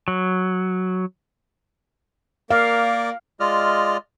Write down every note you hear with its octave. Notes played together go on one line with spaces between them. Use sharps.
F#3
A#3 A#4 D5 F5
G#3 F4 D5 D#5 F6